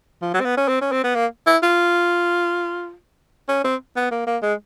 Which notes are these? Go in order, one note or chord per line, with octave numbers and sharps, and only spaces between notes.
F3
F#3
C4
B3
C#4
C4
C#4
C4
B3
A#3
E4
F4
C#4
C4
B3
A#3
A#3
G#3